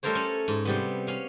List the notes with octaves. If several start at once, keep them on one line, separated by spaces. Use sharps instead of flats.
G3 A3 A4 A#4 C5 C#5
C#4
G#2
C3 G3 B3
C#4 F5